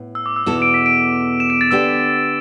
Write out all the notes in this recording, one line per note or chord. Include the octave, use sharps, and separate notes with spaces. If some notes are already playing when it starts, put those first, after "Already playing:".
Already playing: A2 B3
E6
D6
E6
E2 B2 B3 E4 A4 E7
D7
B6
D7
E7
D7
A6
D3 B3 D4 G4 E6